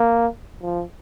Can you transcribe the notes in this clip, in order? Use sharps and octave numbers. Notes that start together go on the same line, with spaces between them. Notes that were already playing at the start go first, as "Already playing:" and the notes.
Already playing: A#3
F3